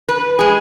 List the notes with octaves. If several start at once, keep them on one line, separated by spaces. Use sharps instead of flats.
B4
G#3 G#4